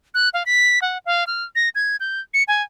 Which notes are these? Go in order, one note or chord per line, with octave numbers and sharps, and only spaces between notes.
F#6
F5
B6
F#5
F5
F6
A#6
G#6
G6
C#7
G#5